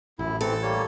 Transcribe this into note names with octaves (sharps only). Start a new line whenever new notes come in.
A1 F#2 E4
E3 C4 A4
G3 A#3 C#5